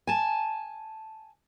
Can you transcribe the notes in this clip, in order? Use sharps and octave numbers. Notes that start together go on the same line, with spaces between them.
G#5 A5